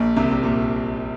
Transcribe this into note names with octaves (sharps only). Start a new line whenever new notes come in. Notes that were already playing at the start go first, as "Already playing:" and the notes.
Already playing: A#1 A#2
C2 C3
C3
A#2